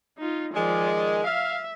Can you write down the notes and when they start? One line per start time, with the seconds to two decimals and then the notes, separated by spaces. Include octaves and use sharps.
0.18 D#4 F4
0.54 D#3 F3 G#3 D5
1.24 E5 F5